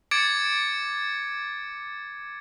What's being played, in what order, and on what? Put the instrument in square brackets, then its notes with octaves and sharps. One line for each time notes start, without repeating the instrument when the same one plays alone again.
[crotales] D6 G#6 A6 C#7 D7